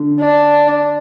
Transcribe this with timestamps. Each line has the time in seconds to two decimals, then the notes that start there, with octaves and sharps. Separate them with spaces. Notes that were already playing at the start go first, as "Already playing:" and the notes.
Already playing: D3
0.20 D4